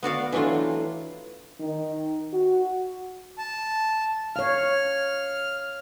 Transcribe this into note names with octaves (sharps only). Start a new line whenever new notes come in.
B3 F#4 D5 F5
E3 F#3 A3 D4 F4
D#3
F#4
A5
C#5 F5 F6